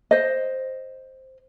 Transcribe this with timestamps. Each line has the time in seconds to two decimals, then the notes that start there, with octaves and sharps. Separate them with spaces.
0.11 C5 D#5